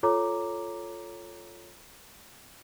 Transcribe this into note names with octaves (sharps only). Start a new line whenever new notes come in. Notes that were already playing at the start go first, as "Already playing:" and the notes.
F4 A4 C#5 A#5 D6